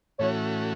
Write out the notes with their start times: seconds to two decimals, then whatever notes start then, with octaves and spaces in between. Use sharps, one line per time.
0.19 A2 E3 A3 C#4 F#4 C#5